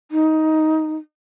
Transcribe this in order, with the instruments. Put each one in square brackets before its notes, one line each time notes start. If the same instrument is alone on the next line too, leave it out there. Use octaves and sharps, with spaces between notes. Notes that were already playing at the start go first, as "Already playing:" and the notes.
[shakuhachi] D#4